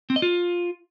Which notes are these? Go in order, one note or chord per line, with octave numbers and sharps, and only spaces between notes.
C4
D#5
F4